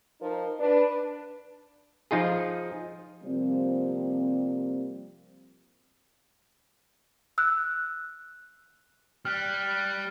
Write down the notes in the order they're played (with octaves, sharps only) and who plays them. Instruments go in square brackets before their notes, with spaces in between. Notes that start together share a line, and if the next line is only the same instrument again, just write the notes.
[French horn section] F3 D#4 A#4
D4 B4
[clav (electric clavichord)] F3 D#4 F4 G#4
[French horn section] C3 F3 G3 A#3 C4
[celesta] E6 F#6
[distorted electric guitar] G3 [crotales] F6 F#6